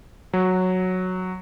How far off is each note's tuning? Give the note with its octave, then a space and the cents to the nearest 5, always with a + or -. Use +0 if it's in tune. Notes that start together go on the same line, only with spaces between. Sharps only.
F#3 -5